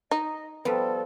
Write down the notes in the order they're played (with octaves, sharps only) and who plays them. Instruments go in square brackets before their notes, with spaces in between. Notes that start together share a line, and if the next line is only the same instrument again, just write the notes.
[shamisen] D#4 [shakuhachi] D#5
[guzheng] F3 G3 B4 [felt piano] B3 [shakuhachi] A4